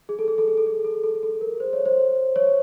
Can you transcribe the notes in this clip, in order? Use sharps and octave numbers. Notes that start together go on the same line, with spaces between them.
G#4
A4
G#4
A4
G#4
A4
G#4
A4
A4
A4
A#4
C5
C#5
C5
C#5